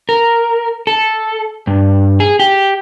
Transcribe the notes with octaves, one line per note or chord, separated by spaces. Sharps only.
A#4
A4
G2
G#4
G4